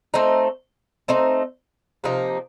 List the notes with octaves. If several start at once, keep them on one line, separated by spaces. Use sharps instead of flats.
A3 C4 D#4
A3 C4 D#4
C3 F3 A#3 D#4